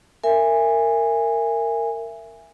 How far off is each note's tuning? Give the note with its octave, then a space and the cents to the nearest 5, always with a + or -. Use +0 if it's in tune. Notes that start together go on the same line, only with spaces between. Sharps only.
A#4 -20 E5 +20 G#5 -15